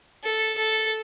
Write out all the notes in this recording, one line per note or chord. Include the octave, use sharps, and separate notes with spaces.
A4
A4